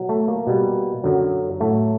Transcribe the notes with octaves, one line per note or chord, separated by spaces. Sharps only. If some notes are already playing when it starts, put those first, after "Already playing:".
Already playing: B2 F#3
A3
A#3
B2 G3
F#2 D3 F#3
A2 F#3 A3